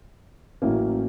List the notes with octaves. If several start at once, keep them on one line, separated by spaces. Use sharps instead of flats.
A1 A2 F#3 A#3 C#4